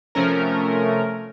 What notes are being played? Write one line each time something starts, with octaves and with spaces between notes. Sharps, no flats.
C3 F3 A3 C#4 A#4